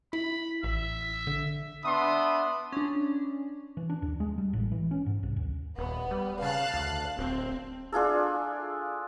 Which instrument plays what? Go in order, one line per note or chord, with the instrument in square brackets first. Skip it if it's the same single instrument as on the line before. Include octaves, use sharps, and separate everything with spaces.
[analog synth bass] E4 [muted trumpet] B5
[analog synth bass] A1 [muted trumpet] E5
[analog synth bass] D3
[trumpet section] B3 D4 E5 B5 C6 D#6
[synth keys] C#4 D4
[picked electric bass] E3
D4
D#2
G#3
G3
A1
E3
C#4
G#2
C2
D#2
[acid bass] D#1 [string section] B3
[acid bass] G3
[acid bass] C#3 [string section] F5 A5 F#6
[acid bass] D2
[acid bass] D1 [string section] C4
[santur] D4 F4 G#4 A4